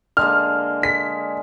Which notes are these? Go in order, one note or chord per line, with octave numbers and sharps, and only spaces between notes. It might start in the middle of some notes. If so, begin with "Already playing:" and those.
D3 G#3 A#3 F6
B6